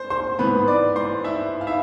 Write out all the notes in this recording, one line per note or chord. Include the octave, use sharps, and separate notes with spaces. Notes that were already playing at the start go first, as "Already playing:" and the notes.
Already playing: C5 C6
C5 C6
G#2 E3 B3 B4 B5
D5 D6
C5 C6
E4 E5
F5
E4 E5